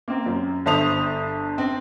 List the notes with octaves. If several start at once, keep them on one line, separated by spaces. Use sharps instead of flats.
A#3 C4
F#2
G1 C5 E5 A5 D#6 F7
C4